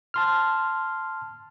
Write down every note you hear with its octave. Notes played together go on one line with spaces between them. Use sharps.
A5 C6 F6